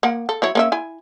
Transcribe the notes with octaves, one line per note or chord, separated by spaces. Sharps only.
A#3 F#5
A4
F#3 E4 C#5
A#3 C#4 E5
E4 G#5